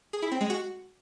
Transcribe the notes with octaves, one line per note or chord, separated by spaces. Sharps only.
G#4
E4
C4
G#3
F#4